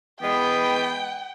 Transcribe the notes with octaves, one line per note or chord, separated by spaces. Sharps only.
E3 G#3 B3 G5